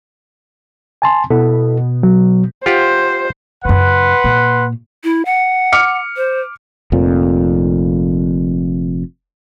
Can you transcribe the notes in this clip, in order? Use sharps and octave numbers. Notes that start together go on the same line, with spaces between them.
G#5 A5 C6
B2 E4 A4
F#3
F4 G4 C5 F#5
F#2 C#3 B4 F#5 C6
A#2
E4
F#5
D6 F6 C#7
C5
F1 F2 A#2